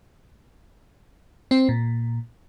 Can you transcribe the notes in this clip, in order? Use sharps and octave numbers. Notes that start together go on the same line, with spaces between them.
C4
A#2